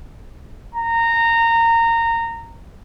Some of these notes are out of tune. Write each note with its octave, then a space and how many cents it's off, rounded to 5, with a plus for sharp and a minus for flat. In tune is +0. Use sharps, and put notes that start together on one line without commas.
A#5 -20